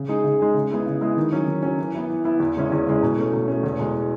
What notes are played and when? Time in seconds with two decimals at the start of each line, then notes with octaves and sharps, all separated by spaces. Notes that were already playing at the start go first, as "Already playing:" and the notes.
Already playing: C#3
0.08 G#3 D#4 G#4
0.24 C#3
0.39 G#3 D#4 G#4
0.54 C#3
0.70 G#3 B3 E4 G#4
0.86 C#3
1.01 G#3 B3 E4 G#4
1.17 D#3
1.32 F#3 C#4
1.48 D#3
1.63 F#3 C#4
1.79 E3
1.95 B3 E4
2.10 E3
2.24 B3 E4
2.40 E2
2.56 C#3 G#3 C#4 E4
2.72 E2
2.87 C#3 G#3 C#4 E4
3.03 B2
3.18 A3 C#4
3.33 B2
3.48 A3 C#4
3.63 E2
3.79 B2 G#3